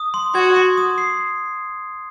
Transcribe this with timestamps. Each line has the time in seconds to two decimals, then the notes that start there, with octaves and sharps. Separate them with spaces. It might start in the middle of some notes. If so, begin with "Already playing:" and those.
Already playing: D#6
0.14 C6
0.35 F#4 G#6
0.56 C6
0.77 D#6
0.98 C7